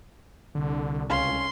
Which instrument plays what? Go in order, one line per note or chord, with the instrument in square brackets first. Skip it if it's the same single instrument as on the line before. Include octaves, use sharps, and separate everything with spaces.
[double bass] C2 [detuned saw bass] D3
[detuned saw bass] C#2 [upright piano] C#4 F5 [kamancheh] C6